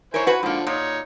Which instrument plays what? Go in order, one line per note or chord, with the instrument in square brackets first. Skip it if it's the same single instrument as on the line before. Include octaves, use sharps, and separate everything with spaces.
[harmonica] E4 C5 G#5 [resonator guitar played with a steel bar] A#4 C#5
[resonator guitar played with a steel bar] F#4 B4
[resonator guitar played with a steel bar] G#2 A#3 [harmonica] D3 F3
[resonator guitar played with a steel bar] A#2 [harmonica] D#4 C#5